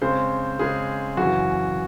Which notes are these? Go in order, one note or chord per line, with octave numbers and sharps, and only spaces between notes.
C#3 G#3 C4 C5
C#3 G#3 C4 G#4
F#2 C#3 E3 F#4